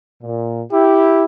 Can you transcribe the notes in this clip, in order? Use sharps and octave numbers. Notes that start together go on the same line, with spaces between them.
A#2
E4 G4